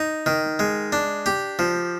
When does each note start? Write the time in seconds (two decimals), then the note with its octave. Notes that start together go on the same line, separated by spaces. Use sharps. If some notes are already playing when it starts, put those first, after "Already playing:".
Already playing: D#4
0.26 D#3
0.59 G#3
0.92 D4
1.26 G4
1.59 F3